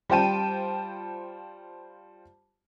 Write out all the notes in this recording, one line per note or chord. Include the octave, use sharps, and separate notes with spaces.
G3 F4 C5 G5 A5 D#7